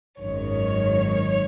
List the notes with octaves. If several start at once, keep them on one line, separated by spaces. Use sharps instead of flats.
G#1 F#2 D#3 C#5